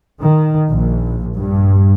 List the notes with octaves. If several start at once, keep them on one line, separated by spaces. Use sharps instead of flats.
D#3
A#1
G2